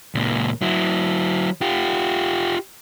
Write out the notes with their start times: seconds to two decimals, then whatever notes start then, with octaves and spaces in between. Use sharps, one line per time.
0.15 C#2 A#2
0.62 F#3 E4
1.61 F4 G4